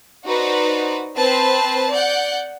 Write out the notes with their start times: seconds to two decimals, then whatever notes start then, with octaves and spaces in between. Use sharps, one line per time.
0.24 D#4 F#4 B4 C5 D5
1.15 C4 B4 C5 A5
1.92 D5 F#5 G6